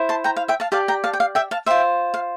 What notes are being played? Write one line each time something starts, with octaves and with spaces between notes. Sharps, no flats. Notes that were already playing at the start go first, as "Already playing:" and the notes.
Already playing: E4 C5
A5 C6
G5 A#5
F5
E5 G5
F5 A5
G4 D5 F5 A5
G5 A#5
F5 A5
G5
F5
E5 G5
F5 A5
F4 C5 E5 G5
F5